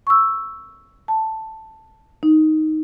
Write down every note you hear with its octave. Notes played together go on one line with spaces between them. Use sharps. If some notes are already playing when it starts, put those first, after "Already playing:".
C#6 E6
A5
D#4